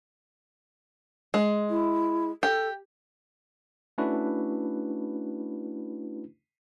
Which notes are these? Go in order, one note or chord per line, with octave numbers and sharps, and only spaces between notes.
G#3
E4
G4 A4
A3 C#4 D4 E4 F#4 B4